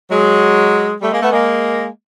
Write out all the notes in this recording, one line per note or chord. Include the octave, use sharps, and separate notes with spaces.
F#3 G#3
G3 A3
G#3 A#3
A3 B3
G#3 A#3